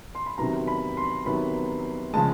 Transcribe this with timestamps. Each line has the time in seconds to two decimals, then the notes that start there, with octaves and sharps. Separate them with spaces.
0.15 C6
0.26 B5
0.38 C3 D#3 F#3 B3 A#5
0.67 B5
0.97 C6
1.26 C3 D#3 F#3 B3 B5
2.13 C#3 F3 G#3 A5